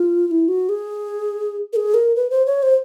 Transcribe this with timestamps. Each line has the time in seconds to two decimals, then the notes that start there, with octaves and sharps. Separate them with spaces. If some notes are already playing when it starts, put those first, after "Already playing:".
Already playing: F4
0.27 F4
0.31 E4
0.48 F#4
0.69 G#4
1.73 A#4
1.76 G#4
1.94 A#4
2.16 B4
2.30 C5
2.46 C#5
2.63 C5